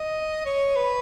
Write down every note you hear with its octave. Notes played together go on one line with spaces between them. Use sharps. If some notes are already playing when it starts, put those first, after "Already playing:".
Already playing: D#5
C#5
B4